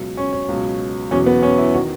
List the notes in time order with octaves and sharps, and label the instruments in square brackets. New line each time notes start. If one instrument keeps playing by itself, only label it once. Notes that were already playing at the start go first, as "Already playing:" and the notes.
Already playing: [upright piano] C#2 B2 F#3
C#4
C#4
C#2 B2 F#3
E2 B2 F#3 C#4
B3
C#4
E4
D#3 F#4